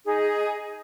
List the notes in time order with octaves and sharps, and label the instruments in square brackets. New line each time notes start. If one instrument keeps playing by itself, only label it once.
[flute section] D#4 G#4